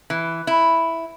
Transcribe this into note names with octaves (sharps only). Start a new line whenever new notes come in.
E3
E4